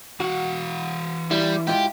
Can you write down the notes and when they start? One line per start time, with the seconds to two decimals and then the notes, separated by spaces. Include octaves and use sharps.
0.20 E3 F#4 F5 F#5
1.31 G3 E4
1.67 G#2 E4 F4 G4